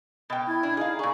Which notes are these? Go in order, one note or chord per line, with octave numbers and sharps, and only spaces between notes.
B2 G5
E4 F6 G#6
D4
D#4 E4 G#4 D#5 F5
A#2 G#4 D5 C#6